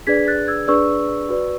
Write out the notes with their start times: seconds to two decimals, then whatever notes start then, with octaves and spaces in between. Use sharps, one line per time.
0.07 D4 G#4 B4 D5 G#6 B6
0.28 F#6 A6
0.48 E6 G#6
0.68 D4 G#4 B4 D5 C#6 E6
1.29 F#4 B4 D5